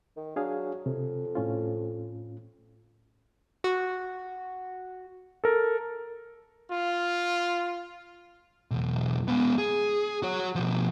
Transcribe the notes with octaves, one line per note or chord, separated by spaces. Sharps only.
D#3
F#3 D4 G#4 F5
F2 C3
A2 C#4 F4
F#4
A4 A#4
F4
B1 E2
G#3 B3
G#4
F#4 C#5
B2 F3